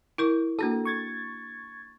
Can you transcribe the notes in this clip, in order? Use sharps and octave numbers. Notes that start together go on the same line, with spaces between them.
E4 A#4 C#6
A#3 D4 F#4 A4
C#6 G#6 A6